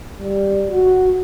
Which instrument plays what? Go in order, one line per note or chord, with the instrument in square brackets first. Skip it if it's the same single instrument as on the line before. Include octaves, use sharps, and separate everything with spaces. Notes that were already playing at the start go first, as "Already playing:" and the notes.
[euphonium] G3
F#4